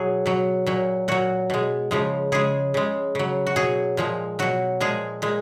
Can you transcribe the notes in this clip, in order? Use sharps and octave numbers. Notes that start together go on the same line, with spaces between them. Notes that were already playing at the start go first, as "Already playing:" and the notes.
Already playing: B2 F#3 G#4
B2 F#3
A#2 F#3
A#2 F#3 F#4
B2 G#3
C#3 F3 G#3
C#3 G#3 G#4
C#3 G#3
C#3 F#3
F#4
B2 F#3 G#4
A#2 F3 G#3
B2 F#3 F#4
A#2 F3 G#3 G#4
A#2 G#3